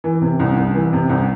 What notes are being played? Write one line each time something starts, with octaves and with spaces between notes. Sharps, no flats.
E3
C3
C2
C2
E3
C3
C2